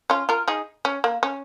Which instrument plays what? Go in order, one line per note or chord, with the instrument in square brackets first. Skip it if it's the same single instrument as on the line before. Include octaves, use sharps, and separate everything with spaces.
[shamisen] C#4 F4
F4 A#4
D#4 G#4
C#4
A#3
C#4